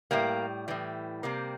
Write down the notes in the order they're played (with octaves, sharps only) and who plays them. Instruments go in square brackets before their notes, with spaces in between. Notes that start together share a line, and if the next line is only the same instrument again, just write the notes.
[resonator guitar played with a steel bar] A2 G3 A#3
A2 E3 G3
C3 G3 A#3